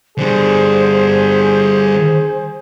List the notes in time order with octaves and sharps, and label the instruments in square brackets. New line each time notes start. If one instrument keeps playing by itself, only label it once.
[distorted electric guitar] D3 G3 [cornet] G#4 [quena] C5